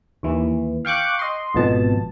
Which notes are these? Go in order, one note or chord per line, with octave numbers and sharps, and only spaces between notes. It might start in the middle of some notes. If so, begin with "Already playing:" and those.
D#2 E3
F5 G5 C#6 D6 F#6
D#5 C6
G#1 F2 B2 A5